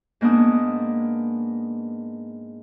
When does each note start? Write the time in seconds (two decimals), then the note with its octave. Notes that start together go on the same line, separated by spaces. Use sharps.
0.21 G#2 A#3 B3 D4 D#6